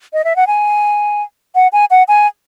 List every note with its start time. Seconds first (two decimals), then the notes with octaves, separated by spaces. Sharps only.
0.13 D#5
0.24 E5
0.36 F#5
0.47 G#5
1.55 F#5
1.73 G#5
1.91 F#5
2.08 G#5